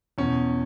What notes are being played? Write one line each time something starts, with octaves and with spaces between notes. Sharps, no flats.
E2 B2 C#4